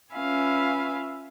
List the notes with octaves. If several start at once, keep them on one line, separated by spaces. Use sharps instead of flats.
C#4 F4 B4 E5 F5 G#5